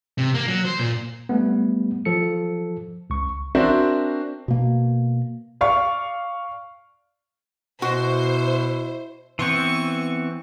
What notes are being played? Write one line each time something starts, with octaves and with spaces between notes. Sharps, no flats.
C3
A#3
F#3
C5
A#2
G3 A3 B3
F3 A4 C#7
C#2 C#6
C4 D4 F#4 A#4 C5 E5
B2 A#3
D5 F5 C#6
B2 E4 F#4 C5
E3 B3 C4 C#6